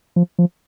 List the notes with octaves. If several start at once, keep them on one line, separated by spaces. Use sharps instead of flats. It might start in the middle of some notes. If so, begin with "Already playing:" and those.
F3
F3